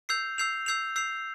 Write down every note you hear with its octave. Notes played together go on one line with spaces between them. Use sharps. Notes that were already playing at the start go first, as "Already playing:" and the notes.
E6 G6 C7 F7
E6 G6 C7 F7
E6 G6 C7 F7
E6 G6 C7 F7